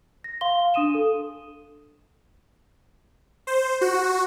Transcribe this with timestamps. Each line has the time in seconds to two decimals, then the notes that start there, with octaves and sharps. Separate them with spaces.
0.24 A#6
0.41 F5 C6 G7
0.60 F5
0.74 D4 C6 D#6 D#7 E7
0.94 A4
3.47 C5
3.81 F#4